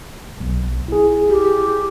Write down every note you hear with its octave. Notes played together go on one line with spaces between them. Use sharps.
B1
E4 G#4
G4